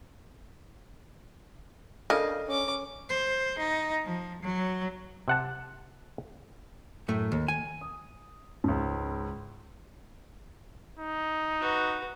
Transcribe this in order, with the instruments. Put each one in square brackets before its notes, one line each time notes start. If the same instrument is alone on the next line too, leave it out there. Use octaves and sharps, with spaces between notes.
[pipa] C#3 D4 F5 [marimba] A4 A#4 F6 [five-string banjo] D#5
[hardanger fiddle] C#4 D6
[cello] C5
D#4
F3
F#3
[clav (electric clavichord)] C3 F#5 A5
[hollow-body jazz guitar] F#2 A2 A3
D#2
G#5
[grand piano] D#6
C#2 G#2
[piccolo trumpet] D#4
[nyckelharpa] F#4 B4